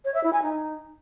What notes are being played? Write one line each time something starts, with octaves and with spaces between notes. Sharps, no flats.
C#5
E5
E4
G#5
D#4